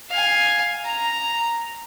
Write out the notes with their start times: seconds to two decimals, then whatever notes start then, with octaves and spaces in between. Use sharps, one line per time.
0.10 F5 G#5
0.85 A#5